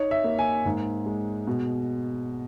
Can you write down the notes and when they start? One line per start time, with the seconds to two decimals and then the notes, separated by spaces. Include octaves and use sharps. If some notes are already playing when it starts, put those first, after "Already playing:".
Already playing: D#4 C#5
0.11 E5
0.24 A#3
0.39 G#5
0.65 G#2
1.06 G#3
1.47 B2